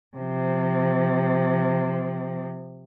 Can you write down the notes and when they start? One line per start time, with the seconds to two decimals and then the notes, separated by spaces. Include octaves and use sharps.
0.17 C3 F3